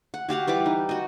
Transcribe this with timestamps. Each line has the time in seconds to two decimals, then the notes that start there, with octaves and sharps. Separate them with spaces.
0.14 F#5
0.29 F#4 G4 F5 F#5
0.47 E3 G3 B4 D6
0.66 D#4
0.89 F#4 D#5